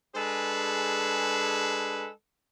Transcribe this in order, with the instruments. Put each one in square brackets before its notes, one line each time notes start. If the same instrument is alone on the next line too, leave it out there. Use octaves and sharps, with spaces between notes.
[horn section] G#3 D4 G#4 A4 B4